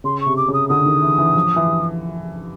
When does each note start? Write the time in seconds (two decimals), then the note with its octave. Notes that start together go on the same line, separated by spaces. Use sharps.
0.04 C#3 C6
0.21 C#6
0.26 C3
0.37 D6
0.48 C#3
0.54 D#6
0.69 D3 D#6
0.86 D#3
1.02 E3
1.18 E3
1.36 F3
1.56 E3